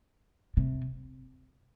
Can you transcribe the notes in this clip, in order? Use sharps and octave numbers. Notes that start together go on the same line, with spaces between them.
C3